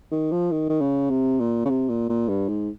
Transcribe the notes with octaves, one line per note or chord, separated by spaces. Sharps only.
D#3
F3
D#3
D#3
C#3
C3
A#2
C#3
C3
A#2
A#2
G2
G#2